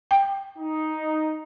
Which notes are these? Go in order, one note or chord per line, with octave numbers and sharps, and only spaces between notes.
G5
D#4